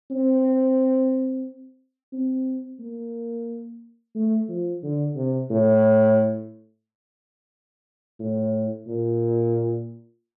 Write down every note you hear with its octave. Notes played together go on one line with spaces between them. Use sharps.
C4
C4
A#3
A3
F3
D3
C3
A2
A2
A#2